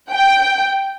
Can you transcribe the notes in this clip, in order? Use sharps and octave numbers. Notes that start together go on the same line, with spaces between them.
G5